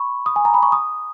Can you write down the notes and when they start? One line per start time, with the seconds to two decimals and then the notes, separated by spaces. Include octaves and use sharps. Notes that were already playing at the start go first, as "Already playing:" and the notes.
Already playing: B5 C#6
0.26 D#6
0.36 G#5
0.45 A#5
0.54 B5
0.63 C#6
0.72 D#6